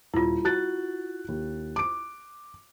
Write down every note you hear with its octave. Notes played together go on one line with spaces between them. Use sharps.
D#1 E4 F4
F#4 F#6 A6
D#2
D6 D7